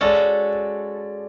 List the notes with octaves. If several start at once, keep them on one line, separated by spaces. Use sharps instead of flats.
G#3 C#4 F#4 A4 D5